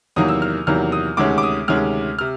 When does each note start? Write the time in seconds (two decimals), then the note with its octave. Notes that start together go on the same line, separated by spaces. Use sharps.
0.16 E2 C3 D#3 F#3 A#3 D#6
0.29 E6
0.42 F6
0.67 E2 C3 D#3 F#3 A#3 F6
0.92 D#6
1.17 D2 C3 D#3 G#3 C#4 D6
1.38 D6
1.43 D#6
1.68 D2 C3 D#3 G#3 C#4 F6
2.19 C3 F6